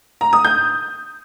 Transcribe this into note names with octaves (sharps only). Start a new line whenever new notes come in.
A#5
D#6
G6